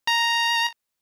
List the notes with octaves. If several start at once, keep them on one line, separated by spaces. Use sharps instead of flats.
A#5